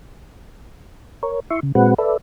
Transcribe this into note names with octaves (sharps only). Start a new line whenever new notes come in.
A#4 C#5
E4 E5 C6 C#6
C#3
A#2 G#3 C4 F#4 B4 F#5
A4 B4 D5 E5